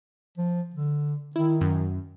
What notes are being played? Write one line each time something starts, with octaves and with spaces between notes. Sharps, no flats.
F3
D3
D#3 E4
F#2